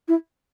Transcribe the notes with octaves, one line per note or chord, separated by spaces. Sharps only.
E4